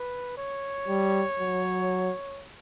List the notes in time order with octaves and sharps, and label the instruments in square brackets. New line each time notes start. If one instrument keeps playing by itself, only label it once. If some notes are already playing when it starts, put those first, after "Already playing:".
Already playing: [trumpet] B4
C#5
[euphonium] G3
F#3